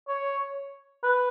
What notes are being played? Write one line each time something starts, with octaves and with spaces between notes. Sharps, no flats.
C#5
B4